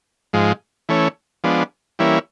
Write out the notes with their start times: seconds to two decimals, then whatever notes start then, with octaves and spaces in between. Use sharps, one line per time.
0.33 G#2 F3 G#3
0.89 E3 A3 C#4
1.44 F3 G#3 B3 D4
1.99 E3 G3 A#3 C#4 E4